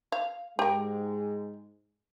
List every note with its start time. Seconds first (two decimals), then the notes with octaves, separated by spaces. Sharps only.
0.12 F5
0.59 G#2 G#3 G4 A#4